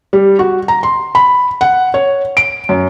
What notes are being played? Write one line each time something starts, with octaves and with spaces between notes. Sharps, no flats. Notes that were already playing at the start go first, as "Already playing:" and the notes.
G3
F#4
A#5
C6
B5
F#5
C#5
D7
F#2